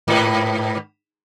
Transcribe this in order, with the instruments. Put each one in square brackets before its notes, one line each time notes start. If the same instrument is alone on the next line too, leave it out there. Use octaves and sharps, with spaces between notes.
[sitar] G#2 B4